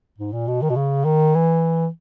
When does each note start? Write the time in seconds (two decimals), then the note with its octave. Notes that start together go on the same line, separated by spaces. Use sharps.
0.18 G#2
0.32 A#2
0.48 B2
0.62 D#3
0.70 B2
0.76 C#3
1.05 D#3
1.35 E3